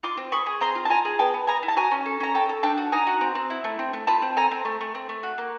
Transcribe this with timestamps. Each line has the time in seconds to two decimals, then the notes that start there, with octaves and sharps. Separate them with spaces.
0.03 F4 C6 D6
0.17 C4
0.32 G#4 B5 C#6
0.46 G#4
0.61 C4 A#5 C6
0.75 F4
0.85 A5
0.90 F4 G#5 A#5
1.05 G#4
1.19 B3 G5 A5
1.34 B3
1.47 B3 G#5 A#5
1.63 E4
1.68 A5
1.77 F#4 G#5 A#5
1.91 C#4
2.06 A4
2.20 C#4 A#5
2.34 A4 G5 A5
2.49 A4
2.63 D4 G5 A5
2.77 F#4
2.92 D#4 G#5 A#5
3.07 F#4
3.21 C4
3.35 C4
3.50 E4
3.64 A3
3.79 C4
3.93 A3
4.07 F4 A5 B5
4.22 C4
4.37 A4 G#5 A#5
4.51 C4
4.65 A3
4.81 A3
4.95 C4
5.09 A3
5.23 F#4
5.38 A#3